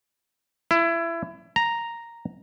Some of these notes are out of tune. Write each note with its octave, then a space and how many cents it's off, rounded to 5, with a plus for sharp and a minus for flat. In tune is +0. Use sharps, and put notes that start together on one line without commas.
E4 +25
A#5 +0